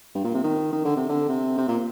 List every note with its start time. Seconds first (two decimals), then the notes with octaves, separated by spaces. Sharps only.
0.15 G2
0.24 A#2
0.34 C3
0.44 D#3
0.72 D#3
0.85 D3
0.96 C3
1.09 D3
1.29 C3
1.57 C3
1.68 A#2